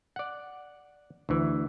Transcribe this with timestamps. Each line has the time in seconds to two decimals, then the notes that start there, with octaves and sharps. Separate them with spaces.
0.16 D5 F#5
1.29 D2 E3